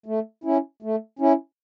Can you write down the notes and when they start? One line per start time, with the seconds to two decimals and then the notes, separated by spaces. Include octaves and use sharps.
0.06 A3
0.44 C#4 E4
0.82 A3
1.19 C#4 E4